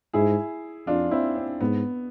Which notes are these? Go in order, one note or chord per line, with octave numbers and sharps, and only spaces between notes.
G#2 E4 G#4
F2 D4 F4
C4 E4
C4
G#2 B3